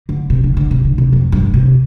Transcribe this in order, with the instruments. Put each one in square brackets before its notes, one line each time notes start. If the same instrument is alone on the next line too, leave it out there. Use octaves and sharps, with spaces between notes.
[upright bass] D3
C3
D3
D3
C3
D3
C3
F2
G2
C3